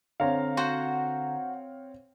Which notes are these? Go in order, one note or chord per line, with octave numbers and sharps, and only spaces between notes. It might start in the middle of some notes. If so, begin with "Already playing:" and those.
D3 C4 C#5 F5 A#5
F#4 C5 F#5